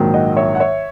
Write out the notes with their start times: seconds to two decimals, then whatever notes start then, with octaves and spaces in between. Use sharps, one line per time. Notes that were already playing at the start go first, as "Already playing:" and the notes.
Already playing: A#1 G#2 D#3 F#3
0.14 D#5 F#5
0.37 C#5 E5
0.55 F#5
0.60 C#5 E5